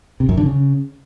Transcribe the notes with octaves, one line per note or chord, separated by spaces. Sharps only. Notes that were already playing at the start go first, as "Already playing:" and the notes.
C3
F#2
D3
C#3